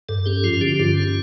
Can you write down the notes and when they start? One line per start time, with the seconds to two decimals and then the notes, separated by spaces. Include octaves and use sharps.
0.09 G2 A4
0.26 C#4 G4
0.43 F3 F4
0.61 D3 G4
0.79 G2 F4
0.97 C#4
1.08 F4